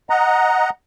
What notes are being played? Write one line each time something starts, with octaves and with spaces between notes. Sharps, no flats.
D#5 F#5 A#5